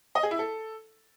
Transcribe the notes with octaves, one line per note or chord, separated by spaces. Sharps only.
D#5
G#4
E4
A4